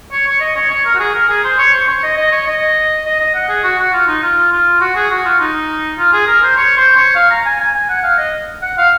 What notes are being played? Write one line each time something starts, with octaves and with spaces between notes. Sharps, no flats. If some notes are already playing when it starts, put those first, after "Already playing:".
C#5
C#5
D#5
C#5
C#5
A#4
F#4
G#4
A#4
G#4
C5
C#5
C5
C#5
D#5
D#5
C#5
D#5
D#5
D#5
F#5
G#4
F#4
F#4
F4
D#4
F4
F4
F#4
G#4
F#4
F4
D#4
F4
G#4
A#4
C5
C#5
C5
C#5
F5
A#5
G#5
G#5
G#5
F#5
F5
D#5
F#5
F5